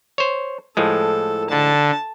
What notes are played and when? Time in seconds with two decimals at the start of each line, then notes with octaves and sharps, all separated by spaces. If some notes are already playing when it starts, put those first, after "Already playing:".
0.18 C5 C#5
0.77 A2 F3 G#3 A4
1.50 D3 A5